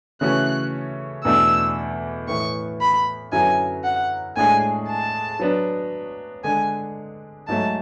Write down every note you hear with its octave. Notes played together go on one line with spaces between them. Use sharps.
C#3 E3 A3 C#4 F#4 F#6
E2 B2 A3 D4 E6
A2 E3 B3 C#6
B5
F#2 D3 F#3 B3 E4 G#5
F#5
A2 G#3 D4 G#4 G#5
A5
F#3 B3 D4
D3 G#3 D4 G#5
G#2 F#3 A3 A5